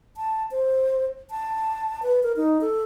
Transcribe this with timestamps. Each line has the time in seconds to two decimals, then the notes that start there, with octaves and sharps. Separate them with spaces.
0.17 A5
0.51 C5
1.30 A5
2.03 B4
2.23 A#4
2.36 D#4
2.61 A4